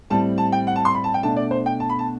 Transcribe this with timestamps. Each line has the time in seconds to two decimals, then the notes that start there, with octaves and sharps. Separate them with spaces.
0.10 A2 G3 C4 A5
0.38 A5
0.52 G5
0.67 F#5
0.76 A5
0.85 C6
0.95 B5
1.04 A5
1.14 G5
1.23 B2 A3 D4 A5
1.37 D5
1.51 C5
1.66 G5
1.80 A5
1.89 B5
1.99 A5